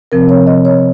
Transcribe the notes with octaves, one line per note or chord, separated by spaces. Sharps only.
C3 F3 C4 A#4
C#5
D#5
C#5